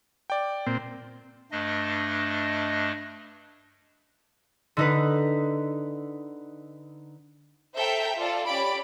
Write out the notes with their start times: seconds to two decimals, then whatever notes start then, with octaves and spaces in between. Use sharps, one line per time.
0.30 D5 G5
0.67 A#2 C4
1.52 G2 A3 D4 D#5
4.77 D3 D#4 B4
7.77 A4 C5 E5 G5 A#5 G6
8.16 F4 A4 D5
8.48 C#4 G4 C#5 D5 B5 D7